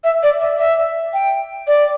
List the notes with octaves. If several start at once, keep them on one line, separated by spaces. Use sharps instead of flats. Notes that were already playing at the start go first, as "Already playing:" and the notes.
E5
D5
E5
E5
G5
D5